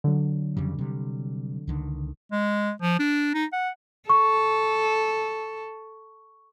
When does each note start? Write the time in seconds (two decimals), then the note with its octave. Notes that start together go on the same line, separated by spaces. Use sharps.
0.04 D3 F#3
0.57 F2 C#3 G3
0.78 C3 G3
1.68 C#2 D3 D#3
2.32 G#3
2.82 F3
2.99 D4
3.34 D#4
3.53 F#5
4.09 A4 C#6